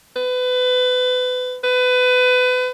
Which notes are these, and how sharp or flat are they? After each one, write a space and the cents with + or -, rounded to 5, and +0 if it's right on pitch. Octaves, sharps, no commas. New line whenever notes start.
B4 +30
B4 +25